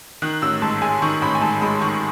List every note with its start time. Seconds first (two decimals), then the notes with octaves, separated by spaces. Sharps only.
0.22 D#3 F#6
0.42 A1 E6
0.62 G#2 A5
0.82 G#3 G#5
1.02 D#3 C#6
1.22 A1 B5
1.35 G#5
1.41 G#2 A5
1.61 G#3 B5
1.81 D#3 C#6